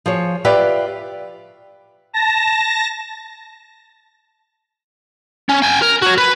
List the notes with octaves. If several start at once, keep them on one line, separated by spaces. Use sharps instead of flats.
F3 G#4 C#5
F4 G4 B4 D5 E5
A5 A#6
C#4
G5 G#5
A#4
F#4 C#5
B4